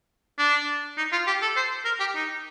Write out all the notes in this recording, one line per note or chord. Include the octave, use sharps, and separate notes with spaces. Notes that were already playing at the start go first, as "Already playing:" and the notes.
D4
D#4
F4
G4
A4
C5
A#4
G4
D#4